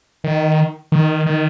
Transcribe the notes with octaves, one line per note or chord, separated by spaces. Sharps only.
D#3
D#3
D#3